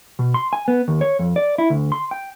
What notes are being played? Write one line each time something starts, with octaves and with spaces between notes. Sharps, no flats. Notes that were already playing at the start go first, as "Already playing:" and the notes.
B2
C6
G#5
B3
D#2
C#5
F2
D5
E4
D2
C6
G5